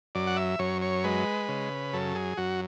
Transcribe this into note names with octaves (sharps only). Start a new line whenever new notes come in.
F#2 D5
F#5
E5
F#2 C#5
C#5
G#3 B4
C#3
F#2 A4
G#4
F#2 F#4